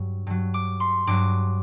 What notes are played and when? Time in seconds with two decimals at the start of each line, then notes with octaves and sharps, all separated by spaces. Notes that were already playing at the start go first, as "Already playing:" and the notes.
Already playing: G2 F#3
0.27 G2 F#3
0.54 D6
0.80 C6
1.07 G2 F#3 D6